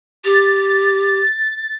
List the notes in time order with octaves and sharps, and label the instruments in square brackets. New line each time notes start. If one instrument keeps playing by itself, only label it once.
[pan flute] G4 [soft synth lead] A6